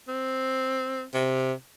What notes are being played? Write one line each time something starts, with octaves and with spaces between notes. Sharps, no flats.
C4
C3